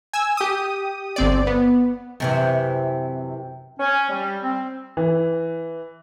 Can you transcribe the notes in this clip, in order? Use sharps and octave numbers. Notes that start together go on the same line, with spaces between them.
G#5 E6
G4 D#6
G1 C4 D5
B3
F#2 C3 E3
C#4
G3
C4
E3